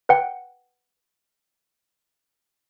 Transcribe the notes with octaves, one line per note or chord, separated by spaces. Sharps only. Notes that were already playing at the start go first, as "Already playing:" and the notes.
B4 F#5 G5